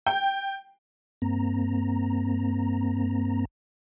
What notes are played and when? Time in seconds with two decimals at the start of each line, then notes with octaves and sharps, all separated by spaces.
0.06 G5
1.22 G2 A#3 C4 A#5